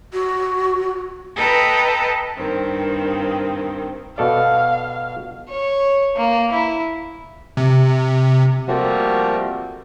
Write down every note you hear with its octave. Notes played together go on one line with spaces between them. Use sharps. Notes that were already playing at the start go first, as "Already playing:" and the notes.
F#4
A4 B4 D#5 G5 A5 A#5
G2 D#3 C4
B2 A4 D5 F5
C#5
A#3
E4
C3
F3 G3 A3 A#3 C4 F#4